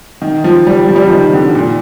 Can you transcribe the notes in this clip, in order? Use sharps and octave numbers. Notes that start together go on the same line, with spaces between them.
D#3
F3
G3
F3
G3
F3
D#3
D3
A#2